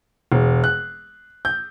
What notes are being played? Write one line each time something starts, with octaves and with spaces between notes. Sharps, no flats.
E1
F#6
G6